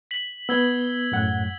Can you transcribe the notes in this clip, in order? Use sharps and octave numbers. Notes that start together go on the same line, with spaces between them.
B6 F#7
B3 E6 G#6 G7
F#2 A2 F#5